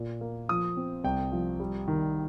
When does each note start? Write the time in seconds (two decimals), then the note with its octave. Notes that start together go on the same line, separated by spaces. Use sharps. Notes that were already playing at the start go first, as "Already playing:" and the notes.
Already playing: A#2
0.21 A#3
0.49 F3 D#6
0.77 C4
1.04 C2 G5
1.32 F3
1.60 G3
1.88 D#3